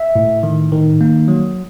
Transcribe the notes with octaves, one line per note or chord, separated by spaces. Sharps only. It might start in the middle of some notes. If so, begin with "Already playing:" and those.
Already playing: E5
A2
D#3
D#3
A#3
F#3